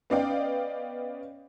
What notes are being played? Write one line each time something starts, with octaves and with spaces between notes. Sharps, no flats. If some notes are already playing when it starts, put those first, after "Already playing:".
B3 C#4 D5 D#5 F5 G5